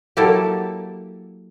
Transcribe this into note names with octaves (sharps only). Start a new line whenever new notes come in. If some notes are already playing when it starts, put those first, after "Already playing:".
F#3 A#3 E4 G4 A4